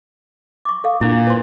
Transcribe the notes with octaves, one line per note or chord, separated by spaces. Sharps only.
C#6 D6
A4 F5
A#2 D4 E4
B4 C5 C6